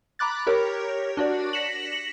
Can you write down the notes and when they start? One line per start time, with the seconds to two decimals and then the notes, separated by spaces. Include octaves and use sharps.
0.19 A#5 B5 D6 F#6 A6
0.47 G4 A#4 C#5
1.17 D4 F#4 D5
1.53 A#6 B6 C#7 E7 F#7